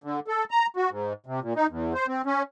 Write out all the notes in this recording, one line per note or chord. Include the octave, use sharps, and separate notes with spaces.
D3
A4
A#5
F#4
G#2
C3
A#2
D#4
E2
C5
C4
C#4